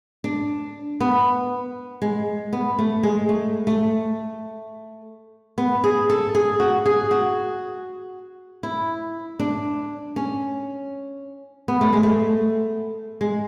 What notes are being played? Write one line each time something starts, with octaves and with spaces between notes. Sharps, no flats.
D4
B3
G#3
B3
A3
G#3
A3
A3
B3
G#4
A4
G#4
F#4
G#4
F#4
E4
D4
C#4
B3
A3
G#3
A3
G#3